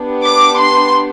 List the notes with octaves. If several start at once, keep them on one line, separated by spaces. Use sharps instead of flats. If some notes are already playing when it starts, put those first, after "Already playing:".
Already playing: B3 D4 G4
D6
C6